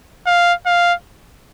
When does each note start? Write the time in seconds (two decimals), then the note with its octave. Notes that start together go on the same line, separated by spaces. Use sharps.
0.26 F5
0.66 F5